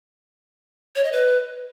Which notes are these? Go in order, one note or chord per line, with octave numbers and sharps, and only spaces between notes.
C#5
D#5
B4